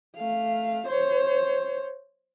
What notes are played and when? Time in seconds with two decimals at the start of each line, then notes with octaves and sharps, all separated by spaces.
0.17 A3 F5
0.87 C5 C#5